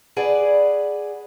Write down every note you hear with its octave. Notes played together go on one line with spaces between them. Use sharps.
G#4 B4 D5 F#5